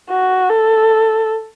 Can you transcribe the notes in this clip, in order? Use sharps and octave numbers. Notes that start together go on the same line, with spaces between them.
F#4
A4